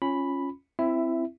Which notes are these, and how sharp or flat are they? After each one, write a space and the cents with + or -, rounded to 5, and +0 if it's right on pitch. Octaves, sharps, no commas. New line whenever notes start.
C#4 -10 F4 +0 B5 +0
C4 +0 E4 +15 E5 +0